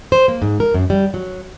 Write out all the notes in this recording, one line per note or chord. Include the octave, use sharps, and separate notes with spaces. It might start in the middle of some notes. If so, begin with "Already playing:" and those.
C5
A#3
G#2
A#4
F#2
G3
F#3